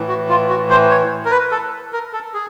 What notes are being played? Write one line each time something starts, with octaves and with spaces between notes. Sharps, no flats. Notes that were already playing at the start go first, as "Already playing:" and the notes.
Already playing: A2 E3
F#4
F4
F#4
C5
C#5
A#4
B4
A4
A#4
A4
G#4